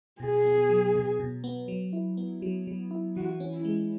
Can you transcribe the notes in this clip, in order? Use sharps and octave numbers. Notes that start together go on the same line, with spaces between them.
B2 G#4
B3
F#3
B2
B2
B3
F#3
E4
B3
F#3
F#3
E4
E3 F#4
C#4
E4
G#3